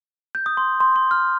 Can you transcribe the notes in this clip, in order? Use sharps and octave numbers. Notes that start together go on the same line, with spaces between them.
G6
D#6
C6
C6
C6
F6